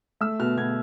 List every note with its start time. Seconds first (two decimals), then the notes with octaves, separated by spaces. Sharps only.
0.21 A3 E6
0.40 B2 F6
0.57 B2 G#6